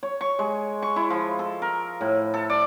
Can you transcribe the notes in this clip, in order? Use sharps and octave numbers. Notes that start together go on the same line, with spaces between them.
C#5
C#6
G#3
C#6
E4
F3
A4
A#4
A2
A4
D5